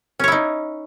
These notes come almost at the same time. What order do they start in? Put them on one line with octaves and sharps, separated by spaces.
C#4 C#5 E4 D#4